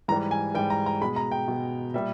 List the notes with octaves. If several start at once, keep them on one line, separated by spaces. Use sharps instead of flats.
G#2 E3 G3 A#5
G#5
G#2 E3 G3 G5
A#5
A#5
B2 G#3 B5
A#5
G5
B2 G#3
A#2 G3 E5